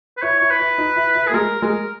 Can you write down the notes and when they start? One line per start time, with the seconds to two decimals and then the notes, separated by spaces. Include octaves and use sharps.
0.17 B4
0.22 E4 C#5
0.39 E4 C#5
0.51 B4
0.60 E4
0.78 D#4
0.96 E4
1.15 E4
1.27 A#3 G#4
1.34 G#3 A#4
1.62 G#3 A#4